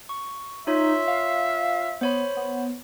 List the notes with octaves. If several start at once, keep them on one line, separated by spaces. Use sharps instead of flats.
C#6
D#4 F4 C#5 E5 C6
F5
B3 C5 C#5 B5
B3